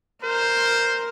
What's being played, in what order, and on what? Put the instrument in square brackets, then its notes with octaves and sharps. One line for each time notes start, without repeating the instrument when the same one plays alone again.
[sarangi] A#4 [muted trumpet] C5